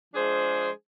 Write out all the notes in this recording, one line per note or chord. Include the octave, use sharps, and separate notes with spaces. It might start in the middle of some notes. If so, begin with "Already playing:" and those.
F3 G#3 D4 G#4 C5